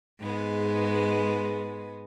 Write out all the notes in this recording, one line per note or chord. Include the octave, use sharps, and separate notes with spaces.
G#2 G#3 B3